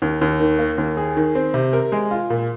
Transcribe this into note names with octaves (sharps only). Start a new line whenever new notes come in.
D#2
D#2
D#3
A#3
D#2
G#4
D#3
C4
C3
A#4
G#3
F4
A#2